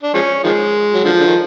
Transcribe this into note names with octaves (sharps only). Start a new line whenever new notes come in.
D4
F3 G#3 C#4
D#3 F3 G#3
F#3
D3 F3
D3
D#3